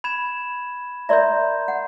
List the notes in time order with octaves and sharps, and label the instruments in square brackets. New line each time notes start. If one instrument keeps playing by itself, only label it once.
[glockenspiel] B5 G#6 E7
[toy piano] A#4 D5 E5 [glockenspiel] A#5 C6 G6
[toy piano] F#5